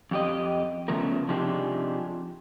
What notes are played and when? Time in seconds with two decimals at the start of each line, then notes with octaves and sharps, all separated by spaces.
0.11 F2 G4 D#5
0.88 C#3 F3 A3 B3 A#4
1.29 C3 F3 D4 D#4 G4 G#4